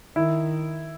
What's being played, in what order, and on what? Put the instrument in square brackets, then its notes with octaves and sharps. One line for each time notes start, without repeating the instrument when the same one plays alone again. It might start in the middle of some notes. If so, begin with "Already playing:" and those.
[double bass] D#3 [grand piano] E4